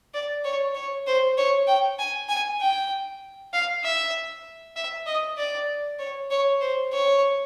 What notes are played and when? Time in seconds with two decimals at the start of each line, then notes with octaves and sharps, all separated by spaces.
0.14 D5
0.45 C#5
0.75 C#5
1.07 C5
1.38 C#5
1.67 G5
1.99 G#5
2.29 G#5
2.61 G5
3.53 F5
3.84 E5
4.76 E5
5.06 D#5
5.37 D5
5.99 C#5
6.31 C#5
6.61 C5
6.92 C#5